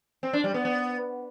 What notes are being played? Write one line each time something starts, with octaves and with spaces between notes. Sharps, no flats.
C4
D4
G3
B3
B3